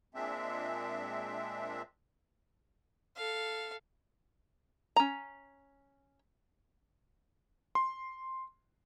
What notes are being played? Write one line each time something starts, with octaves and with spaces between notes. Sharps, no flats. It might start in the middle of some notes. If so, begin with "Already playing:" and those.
A#2 G#3 C4 D4 E5
A4 F5
C#4 A#5
C6